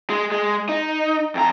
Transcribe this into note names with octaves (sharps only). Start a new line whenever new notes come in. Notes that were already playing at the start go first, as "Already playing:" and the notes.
G#3
G#3
D#4
F2 A#5